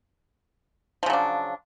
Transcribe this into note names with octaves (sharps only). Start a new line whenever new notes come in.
C#3 F3 F#3 D4